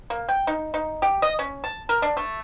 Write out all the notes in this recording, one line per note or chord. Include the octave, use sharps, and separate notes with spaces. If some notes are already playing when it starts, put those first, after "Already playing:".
A#3
G5
D#4
D#4
G4
D#5
C#4
A5
A#4
D4
A3